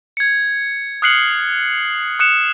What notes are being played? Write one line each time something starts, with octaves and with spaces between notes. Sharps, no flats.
G#6 C#7
D#6 F6 F#6 C7 C#7 F#7
D#6 F#6 C#7 E7